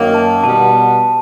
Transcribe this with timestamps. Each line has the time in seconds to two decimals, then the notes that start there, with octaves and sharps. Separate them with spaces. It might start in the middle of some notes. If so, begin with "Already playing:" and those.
Already playing: F#2 D#3 F#3 A#3
0.15 A5
0.44 B2 G3 B3 A5